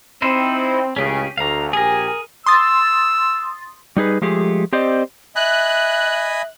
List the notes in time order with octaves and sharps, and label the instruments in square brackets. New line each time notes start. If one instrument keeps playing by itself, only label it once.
[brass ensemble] C4 [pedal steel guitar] D#4 E4 C5
[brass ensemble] C#2 A2 C#3 [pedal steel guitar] C#4 G4 G#4
[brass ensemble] D2 [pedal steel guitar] F5 A#5
[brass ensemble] A#1 G4 G#5 [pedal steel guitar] G#4 A#4
[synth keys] C6 D#6 A6 [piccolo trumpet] E6
[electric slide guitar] G3 D#4 G#4 B4
F3 G#3 A3 G4 G#4
C4 G4 C5 D5 D#5
[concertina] D#5 G#5 B5 [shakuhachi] E5 [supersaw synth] F#6